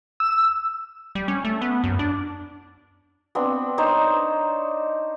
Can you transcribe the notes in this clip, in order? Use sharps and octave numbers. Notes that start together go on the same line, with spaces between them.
E6
G3
C#4
A3
B3
F#2
D4
B3 C4 D4
D4 D#4 C5 C#5